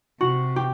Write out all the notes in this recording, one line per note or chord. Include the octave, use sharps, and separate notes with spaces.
C3 F#4
G4